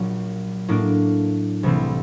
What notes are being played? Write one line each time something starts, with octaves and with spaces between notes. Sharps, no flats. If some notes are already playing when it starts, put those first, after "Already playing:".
Already playing: A#1 A#2 F#3
A2 F#3 A#3 D4
C2 C3 E3 A3 C4